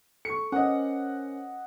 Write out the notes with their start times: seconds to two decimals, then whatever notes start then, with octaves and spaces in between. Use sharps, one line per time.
0.25 A4 C#6 C#7
0.52 C#4 A#4 C5 D#5 F#5